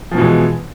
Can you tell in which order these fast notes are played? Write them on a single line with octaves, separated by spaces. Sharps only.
F3 B2 E3 G#3